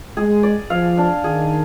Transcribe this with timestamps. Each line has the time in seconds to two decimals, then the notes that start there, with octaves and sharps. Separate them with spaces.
0.16 G#3 G#4
0.43 D5
0.70 F3 F5
0.98 D4
1.24 D#3 G#4